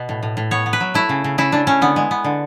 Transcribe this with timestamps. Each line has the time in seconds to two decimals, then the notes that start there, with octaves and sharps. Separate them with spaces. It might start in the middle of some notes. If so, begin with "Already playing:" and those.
Already playing: B2 B3
0.09 A2
0.23 A2
0.37 A2
0.51 B3 C#5
0.66 B3
0.73 B4
0.80 F#3
0.94 A3 E4
1.09 C#3
1.24 C#3
1.38 C#3 E4
1.52 C#3 D4
1.67 C#3 C#4
1.81 D3 B3
1.96 G#3
2.11 B3
2.24 D3